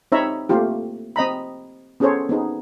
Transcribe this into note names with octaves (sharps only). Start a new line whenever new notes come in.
C4 D#4 C#5 E5 A#5 B5
A3 A#3 C4 F4 G4
C4 D#5 A#5 B5
B3 C#4 G#4 A4 C5 C#5
B3 C4 D#4 G#4